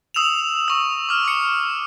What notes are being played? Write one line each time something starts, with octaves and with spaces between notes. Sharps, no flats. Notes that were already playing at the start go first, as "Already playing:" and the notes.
D#6 E6 E7 F7
C#6 E6
D6 F6
D6 C#7